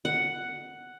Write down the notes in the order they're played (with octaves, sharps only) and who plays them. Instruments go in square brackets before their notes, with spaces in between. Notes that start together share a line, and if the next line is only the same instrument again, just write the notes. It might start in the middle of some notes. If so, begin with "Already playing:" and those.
[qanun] F#5